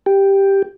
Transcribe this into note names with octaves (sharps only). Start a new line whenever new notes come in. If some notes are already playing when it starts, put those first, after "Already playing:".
G4